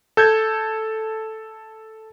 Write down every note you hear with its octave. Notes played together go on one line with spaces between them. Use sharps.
A4 G6 G#6